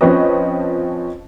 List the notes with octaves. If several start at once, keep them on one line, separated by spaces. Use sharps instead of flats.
F3 C4 C#4 B4 D#5